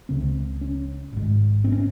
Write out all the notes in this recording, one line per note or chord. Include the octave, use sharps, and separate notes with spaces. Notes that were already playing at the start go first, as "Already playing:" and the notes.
C#2 C#3 C4
C#4
G#1 G#2
C4
C#4